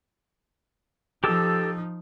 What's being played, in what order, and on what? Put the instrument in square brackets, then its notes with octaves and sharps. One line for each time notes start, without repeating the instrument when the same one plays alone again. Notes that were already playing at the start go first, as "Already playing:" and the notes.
[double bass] F3 D#4 [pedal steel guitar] G4 A4 E6